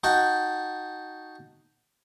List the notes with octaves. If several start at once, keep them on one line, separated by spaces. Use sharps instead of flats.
D#4 F#4 F#5 G5 A5